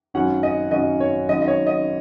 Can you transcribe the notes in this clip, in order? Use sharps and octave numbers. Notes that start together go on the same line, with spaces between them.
G#1 F#2 F#3 C#4 F#5
D#5
G#1 F#2 F#3 C#4 D#5
C#5
G#1 F#2 F#3 D#5
D#5
C#5
D#5